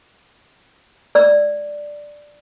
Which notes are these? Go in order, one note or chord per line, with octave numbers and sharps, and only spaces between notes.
D5 E6